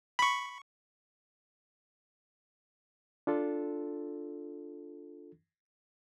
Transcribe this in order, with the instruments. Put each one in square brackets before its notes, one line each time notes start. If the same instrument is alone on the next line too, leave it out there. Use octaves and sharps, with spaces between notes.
[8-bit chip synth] B5 C#6
[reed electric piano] D4 F4 A4